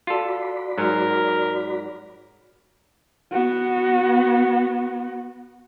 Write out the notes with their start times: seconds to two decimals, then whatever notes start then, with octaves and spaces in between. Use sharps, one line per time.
0.07 F4 F#4 A4 D5 B5
0.78 G#2 F#3 A#4
3.33 B3 F#4